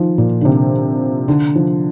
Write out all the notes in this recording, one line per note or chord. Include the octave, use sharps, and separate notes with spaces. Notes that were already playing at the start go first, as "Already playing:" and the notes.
Already playing: D#3 F3
A#2
D3
C3
D3
F3